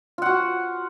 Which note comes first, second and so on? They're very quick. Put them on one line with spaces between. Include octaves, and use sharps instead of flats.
F4 F#5 F#4